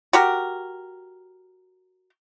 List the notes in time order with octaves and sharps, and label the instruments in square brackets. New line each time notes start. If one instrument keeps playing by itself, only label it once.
[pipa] F#4 G4 A#4